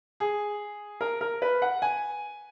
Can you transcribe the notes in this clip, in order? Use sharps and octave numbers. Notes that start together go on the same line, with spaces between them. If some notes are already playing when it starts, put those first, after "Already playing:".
G#4
A#4
A#4
B4
F#5
G#5